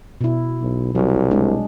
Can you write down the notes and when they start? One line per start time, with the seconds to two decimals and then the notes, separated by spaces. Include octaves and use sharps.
0.21 B2 E4
0.62 B1
0.95 C2 F#3
1.31 G#3 D4